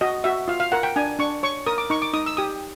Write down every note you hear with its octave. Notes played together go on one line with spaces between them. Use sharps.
F#4 D#5
F#4 E5
F4 F5
F5
A#4 F#5
G5
D4 G#5
D4 C#6
C#5 C#6
A#4 D#6
D6
D#4 C#6
D6
D#4 D#6
E6
G4 D#6